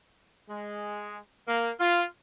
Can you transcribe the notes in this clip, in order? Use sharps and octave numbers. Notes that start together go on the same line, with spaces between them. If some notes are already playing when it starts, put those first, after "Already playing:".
G#3
A#3
F4